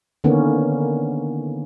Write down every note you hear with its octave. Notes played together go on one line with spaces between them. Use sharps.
D3 D#3 A#3 B3 C#4